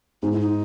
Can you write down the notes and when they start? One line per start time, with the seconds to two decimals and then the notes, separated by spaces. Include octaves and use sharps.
0.23 G#2 D#4
0.31 E4
0.41 D#4